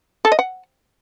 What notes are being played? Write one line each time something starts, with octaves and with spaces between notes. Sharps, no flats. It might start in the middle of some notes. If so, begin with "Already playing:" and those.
A4
D#5
F#5